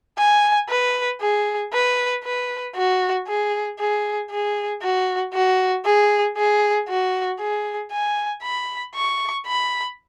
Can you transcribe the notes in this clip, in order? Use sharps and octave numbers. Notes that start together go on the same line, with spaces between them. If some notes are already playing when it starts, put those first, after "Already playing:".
G#5
B4
G#4
B4
B4
F#4
G#4
G#4
G#4
F#4
F#4
G#4
G#4
F#4
G#4
G#5
B5
C#6
B5